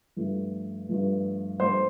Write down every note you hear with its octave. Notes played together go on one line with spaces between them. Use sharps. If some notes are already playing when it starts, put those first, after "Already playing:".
G2 F3 A3
G2 F3 A3
G2 F3 A3 C5 C6